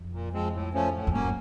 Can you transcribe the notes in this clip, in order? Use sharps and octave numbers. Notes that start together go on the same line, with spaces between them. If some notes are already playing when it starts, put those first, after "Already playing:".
Already playing: F2
A#2
F3 G#3 C4
A2
F3 A3 C#4
A2
F2
G2 F#3 A#3 C#4